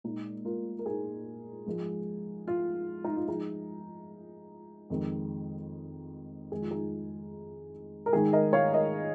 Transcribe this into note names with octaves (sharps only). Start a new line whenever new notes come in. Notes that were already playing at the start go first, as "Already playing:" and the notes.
A#2 G#3 D#4
F4 A#4
A#4
D#4 G#4
G#2 F3 G#3
F4
D#4
F4
G#2 F3 G#3 D#4 G#4
F2 D#3 G#3
F2 D#3 G#3 G#4
F4
D#4 G#4
A#4
G#2 D#3 G#3 D#4 G#4
A#4 D#5
C#5 F5
A#4 D#5